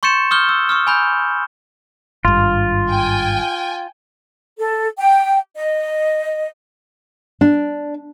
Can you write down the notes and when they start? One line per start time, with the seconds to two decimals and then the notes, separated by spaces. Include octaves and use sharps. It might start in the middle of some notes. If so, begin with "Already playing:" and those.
0.03 C6 C#6 G6 A6 C#7 E7
0.31 C#6 D#6 F6 G6 G7
0.49 E6
0.69 C#6 D#6 F6
0.87 G#5 B5 G6
2.25 G#1 G2 F4
2.89 G5 G#5
4.58 A4
4.97 G5
5.55 D#5
7.41 D4